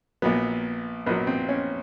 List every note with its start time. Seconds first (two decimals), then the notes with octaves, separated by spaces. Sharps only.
0.22 A#1 A#2 F#3 B3
1.06 A#1 A#2 F#3 B3
1.27 C4
1.49 C#4